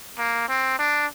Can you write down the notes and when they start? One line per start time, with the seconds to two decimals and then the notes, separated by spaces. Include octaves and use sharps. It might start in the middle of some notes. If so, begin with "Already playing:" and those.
0.19 A#3
0.49 C4
0.79 D4